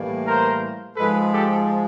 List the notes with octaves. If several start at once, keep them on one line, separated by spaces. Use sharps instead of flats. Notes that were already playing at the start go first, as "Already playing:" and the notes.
Already playing: A2 E3 G3 A#3
A#4 C5
G#2 F3 G#3 A4 B4
G4 A4